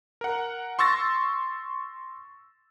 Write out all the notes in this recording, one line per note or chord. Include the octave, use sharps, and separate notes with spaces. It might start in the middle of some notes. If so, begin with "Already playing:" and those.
A#4 F#5
C6 C#6 E6 A6 A#6